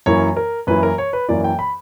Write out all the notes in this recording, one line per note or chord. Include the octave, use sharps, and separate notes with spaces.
F#2 E3 A#3 E4 C#5
A#4
F#2 E3 A#3 E4 B4
A#4
C#5
B4
F#2 E3 A#3 E4 D5
G5
B5